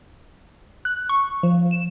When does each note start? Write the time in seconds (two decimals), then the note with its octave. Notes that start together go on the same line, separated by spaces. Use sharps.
0.85 F#6
1.09 C#6
1.43 F3
1.71 E7